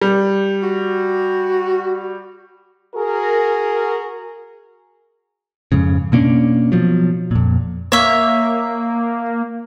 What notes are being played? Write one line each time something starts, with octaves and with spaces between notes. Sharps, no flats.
G3
F#4
F#4 G#4 A#4
F2 G#2 C#3
B2 A#3 C#4 D4
B2 F3 F#3
F2 A#2
A#3 C#5 E5